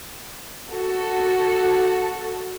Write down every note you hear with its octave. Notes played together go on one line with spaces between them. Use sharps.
F#4 A4